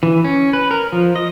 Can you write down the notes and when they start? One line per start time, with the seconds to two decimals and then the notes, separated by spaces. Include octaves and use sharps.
0.03 E3
0.24 C#4
0.53 B4
0.71 A#4
0.92 F3
1.16 D#5